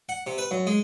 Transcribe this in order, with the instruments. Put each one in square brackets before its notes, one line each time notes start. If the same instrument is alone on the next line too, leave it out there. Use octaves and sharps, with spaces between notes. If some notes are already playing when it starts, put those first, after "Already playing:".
[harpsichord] F#5
C3
B4
F#2
G#3